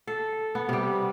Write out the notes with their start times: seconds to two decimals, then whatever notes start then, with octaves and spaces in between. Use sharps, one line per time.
0.07 A4
0.55 B3
0.69 C3 G3